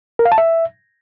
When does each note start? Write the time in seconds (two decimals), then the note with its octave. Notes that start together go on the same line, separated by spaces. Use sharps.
0.19 A#4
0.25 F5
0.32 A5
0.38 E5